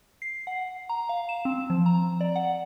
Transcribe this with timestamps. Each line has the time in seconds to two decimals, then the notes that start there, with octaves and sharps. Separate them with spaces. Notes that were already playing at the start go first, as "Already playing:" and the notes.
0.22 C7
0.47 F#5
0.89 A#5
1.09 F5
1.29 E7
1.45 C4
1.70 F3
1.86 A#5
2.21 D5
2.36 F#5